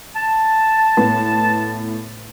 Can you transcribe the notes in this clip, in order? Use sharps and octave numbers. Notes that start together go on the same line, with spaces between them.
A5
A2 B3